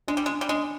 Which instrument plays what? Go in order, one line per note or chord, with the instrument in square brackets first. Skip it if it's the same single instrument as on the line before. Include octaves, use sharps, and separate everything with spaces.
[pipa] G#3 [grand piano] D4
[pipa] G3
[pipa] G#3 [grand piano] D4
[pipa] G3
[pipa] G#3 [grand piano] D4